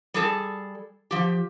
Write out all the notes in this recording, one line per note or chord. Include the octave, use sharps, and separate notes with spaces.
G3 G#4 A4
F3 G4